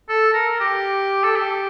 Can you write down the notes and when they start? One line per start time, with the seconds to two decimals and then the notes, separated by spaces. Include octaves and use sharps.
0.09 A4
0.33 A#4
0.60 G4
1.24 A4
1.36 G4